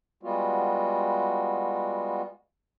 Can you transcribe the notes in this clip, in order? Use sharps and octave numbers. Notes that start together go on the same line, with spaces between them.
G3 G#3 B3 F4 F#4